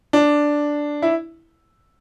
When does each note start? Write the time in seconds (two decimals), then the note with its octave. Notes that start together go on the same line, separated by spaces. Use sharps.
0.13 D4
1.02 E4